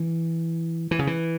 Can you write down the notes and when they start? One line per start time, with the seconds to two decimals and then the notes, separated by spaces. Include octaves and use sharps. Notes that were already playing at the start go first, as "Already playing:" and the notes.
Already playing: E3
0.91 E3
0.99 C#3
1.07 E3